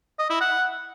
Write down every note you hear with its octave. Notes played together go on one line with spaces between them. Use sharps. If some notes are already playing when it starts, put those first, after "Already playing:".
D#5
E4
F#5